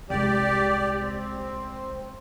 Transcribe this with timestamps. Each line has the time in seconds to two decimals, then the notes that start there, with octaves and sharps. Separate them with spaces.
0.10 C2 G#3 G4 D5
1.01 C4